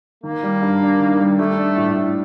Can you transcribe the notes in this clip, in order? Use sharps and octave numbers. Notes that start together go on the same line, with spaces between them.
D#3 A#3
G3
G2
D4
D#3
G3
G3 A3
D4
A2
A2